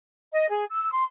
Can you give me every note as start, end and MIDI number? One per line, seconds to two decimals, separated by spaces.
0.33 0.49 75
0.50 0.65 68
0.70 0.88 88
0.92 1.03 84